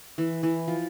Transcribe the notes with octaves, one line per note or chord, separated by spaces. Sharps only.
E3
E3
F3